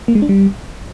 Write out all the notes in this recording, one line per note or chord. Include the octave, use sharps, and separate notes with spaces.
A#3
G#3
D4
G3